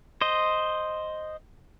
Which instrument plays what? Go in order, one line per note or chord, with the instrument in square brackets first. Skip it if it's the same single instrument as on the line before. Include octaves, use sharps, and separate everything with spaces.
[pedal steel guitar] C5 D#5